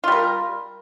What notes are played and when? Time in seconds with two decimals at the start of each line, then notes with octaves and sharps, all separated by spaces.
0.04 F4
0.08 G3
0.12 A#4